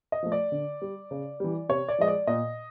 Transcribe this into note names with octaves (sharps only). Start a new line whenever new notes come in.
D#5
F3 A3
D5
D3
G3
C#3
E3 G3
C3 C#5
D5
F3 G#3 D#5
D5
A#2 D#5